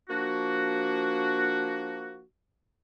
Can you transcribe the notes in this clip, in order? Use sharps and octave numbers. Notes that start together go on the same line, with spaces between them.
F3 A#3 D4 F#4